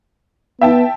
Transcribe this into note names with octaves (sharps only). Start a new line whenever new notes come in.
B3 E5 G5 A5